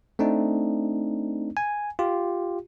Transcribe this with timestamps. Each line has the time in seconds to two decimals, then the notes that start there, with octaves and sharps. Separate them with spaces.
0.19 A3 C4 D4 D#4
1.57 G#5
1.99 F4 G4